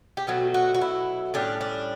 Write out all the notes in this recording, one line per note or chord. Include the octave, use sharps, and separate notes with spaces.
G4
B2 F#3 A3 F#4
F#4
F#4
E4
A2 G3 C#4 D4
D4